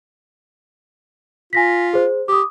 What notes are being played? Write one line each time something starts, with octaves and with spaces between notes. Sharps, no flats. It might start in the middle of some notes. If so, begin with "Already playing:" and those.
F4 G#5 A#6 B6
G#4 C5
G4 D6 D#6